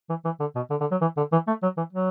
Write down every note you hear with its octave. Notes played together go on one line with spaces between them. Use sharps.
E3
E3
D3
B2
D3
D3
F#3
E3
D3
E3
A3
F#3
E3
F#3